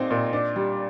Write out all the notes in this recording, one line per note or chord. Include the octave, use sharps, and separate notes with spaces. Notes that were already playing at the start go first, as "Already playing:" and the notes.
Already playing: A#2 C4 D#4
A#2
D4
G3